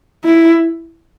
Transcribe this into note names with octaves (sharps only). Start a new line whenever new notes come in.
E4